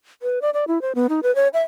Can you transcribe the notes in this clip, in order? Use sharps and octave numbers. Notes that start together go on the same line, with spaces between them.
B4
D5
D5
E4
C5
B3
D#4
B4
C#5
E5